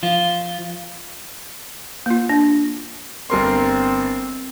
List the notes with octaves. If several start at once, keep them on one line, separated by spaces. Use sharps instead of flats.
F3 F4
A#3 F4
D4
G1 C4 A#4 C6